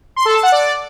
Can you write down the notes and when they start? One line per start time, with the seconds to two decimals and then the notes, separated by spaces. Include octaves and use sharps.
0.16 C6
0.25 A4
0.34 A5
0.43 F#5
0.52 D5